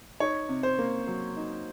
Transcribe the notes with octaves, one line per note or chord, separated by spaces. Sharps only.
D#4 C#5
C3
C5
A#3
F#3
D#4